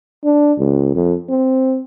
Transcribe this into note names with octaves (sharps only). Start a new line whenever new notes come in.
D4
C#2
F2
C4